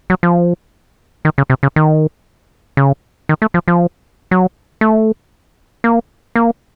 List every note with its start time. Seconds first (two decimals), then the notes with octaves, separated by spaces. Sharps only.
0.10 F#3
0.23 F3
1.25 D#3
1.38 C#3
1.50 C3
1.63 C#3
1.76 D#3
2.77 C#3
3.29 D#3
3.42 A3
3.54 F3
3.68 F3
4.31 F#3
4.81 A3
5.84 A#3
6.36 A#3